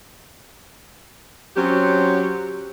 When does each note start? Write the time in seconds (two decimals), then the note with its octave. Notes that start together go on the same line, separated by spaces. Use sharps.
1.57 F#3 C4 C#4 G4